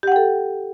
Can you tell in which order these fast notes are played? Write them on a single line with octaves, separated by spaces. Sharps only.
G4 F#5 G5 A4